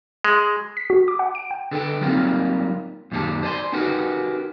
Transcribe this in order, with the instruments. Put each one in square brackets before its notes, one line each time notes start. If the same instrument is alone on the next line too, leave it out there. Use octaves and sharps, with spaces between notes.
[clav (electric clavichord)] G#3
[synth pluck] B6
F#4
D6
F#5
D7
G5
[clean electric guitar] D3 A4 B4 G5
F#3 G3 A#3 C4 D#4 F4
F#2 A#2 D#3 F#4 G4 A5
C5 D5 G#5 C6
C#4 D#4 F#4 G4 A#4 B4